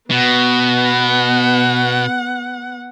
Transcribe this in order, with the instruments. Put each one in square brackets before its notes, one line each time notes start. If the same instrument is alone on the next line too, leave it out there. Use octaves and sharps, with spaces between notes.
[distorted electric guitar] B2 [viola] B3 F#5